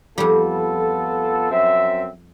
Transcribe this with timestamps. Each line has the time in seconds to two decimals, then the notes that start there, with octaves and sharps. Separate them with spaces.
0.18 F2 G3 B3 F4 A4
1.51 F#2 C4 E5